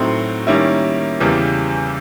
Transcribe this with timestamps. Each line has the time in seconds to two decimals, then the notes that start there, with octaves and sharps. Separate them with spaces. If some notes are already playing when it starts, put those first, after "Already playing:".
Already playing: A2 F#3 A3 C4 D#4
0.47 D#3 G3 A#3 C#4 E4
1.20 E2 C#3 E3 G3